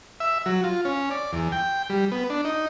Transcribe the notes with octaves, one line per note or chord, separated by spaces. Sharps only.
E5
F#3
F4
C#4
D5
E2
G5
G3
B3
D4
D#4